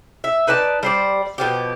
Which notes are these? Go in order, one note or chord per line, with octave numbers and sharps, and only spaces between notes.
E5
D#4 B4 D5 A5
G3 C5 D5
B2 F3 G4